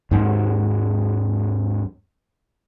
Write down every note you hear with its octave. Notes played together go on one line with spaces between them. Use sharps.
D#2 G#2 F#3